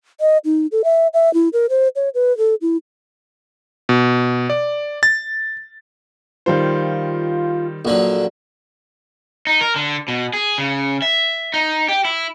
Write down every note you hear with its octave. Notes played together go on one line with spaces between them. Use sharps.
D#5
D#4
A4
E5
E5
E4
A#4
C5
C#5
B4
A4
E4
B2
D5
A6
D#3 G3 F4 C5
A#1 D3 F#3
D#4
A#4
D3
B2
G#4
C#3
E5
D#4
G4
E4